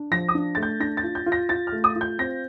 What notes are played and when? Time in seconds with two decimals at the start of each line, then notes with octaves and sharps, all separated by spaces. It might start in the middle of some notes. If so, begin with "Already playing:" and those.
Already playing: D4
0.11 F3 A#6
0.29 D#6
0.35 D4
0.55 A3 A6
0.63 G6
0.80 D4 A#6
0.97 A6
1.03 F4
1.15 G6
1.26 F4
1.32 A#6
1.49 F4 A6
1.67 F6
1.72 A3
1.84 D#6
1.96 F4
2.01 G6
2.19 C4 A#6